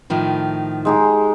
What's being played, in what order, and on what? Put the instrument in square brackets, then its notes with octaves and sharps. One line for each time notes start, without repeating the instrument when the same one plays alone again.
[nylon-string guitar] A2 D#3 F3
[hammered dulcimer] G#3 D#4 G4